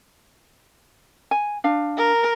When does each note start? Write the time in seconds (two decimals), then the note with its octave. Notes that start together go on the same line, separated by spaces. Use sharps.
1.31 G#5
1.64 D4 F5
1.98 A#4